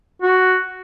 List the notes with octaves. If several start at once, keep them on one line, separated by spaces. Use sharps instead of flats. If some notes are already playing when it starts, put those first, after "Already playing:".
F#4